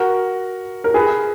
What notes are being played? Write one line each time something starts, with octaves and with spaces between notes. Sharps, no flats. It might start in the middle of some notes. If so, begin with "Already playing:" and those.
Already playing: F#4 A#4
A#4
G#4 B4